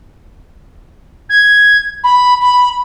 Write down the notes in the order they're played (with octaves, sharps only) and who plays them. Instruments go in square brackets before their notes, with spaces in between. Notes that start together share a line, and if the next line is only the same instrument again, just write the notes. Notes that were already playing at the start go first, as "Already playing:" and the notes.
[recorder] G#6
B5
B5